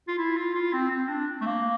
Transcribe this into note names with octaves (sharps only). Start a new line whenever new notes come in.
F4
E4
F4
F4
C4
C4
D4
A3
A#3